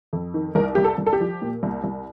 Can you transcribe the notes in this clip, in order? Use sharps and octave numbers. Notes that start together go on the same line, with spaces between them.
F2
D#3
C2 A#4
C2 G4
A4
C2
A4
G4
F3
A#2
C2
C2